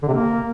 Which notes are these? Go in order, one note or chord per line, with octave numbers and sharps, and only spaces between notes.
D3
C3
A#3